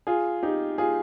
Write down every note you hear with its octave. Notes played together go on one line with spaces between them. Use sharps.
F4 G#4
D#4 G4
F4 G#4